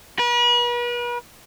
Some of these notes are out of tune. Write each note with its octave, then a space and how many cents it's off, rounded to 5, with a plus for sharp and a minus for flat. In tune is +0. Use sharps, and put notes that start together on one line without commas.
B4 -40